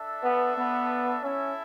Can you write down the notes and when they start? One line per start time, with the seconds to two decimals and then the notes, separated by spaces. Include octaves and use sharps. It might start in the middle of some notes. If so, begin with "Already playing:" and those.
Already playing: D4 A4 E5
0.24 B3
0.58 B3
1.23 C#4 E4 A4 E5